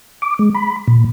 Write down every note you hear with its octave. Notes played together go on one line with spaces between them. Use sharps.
D6
G#3
B5
A#2